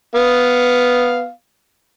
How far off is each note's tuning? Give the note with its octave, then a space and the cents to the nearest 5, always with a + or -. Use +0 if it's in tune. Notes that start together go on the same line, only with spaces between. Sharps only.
B3 +0 F5 +0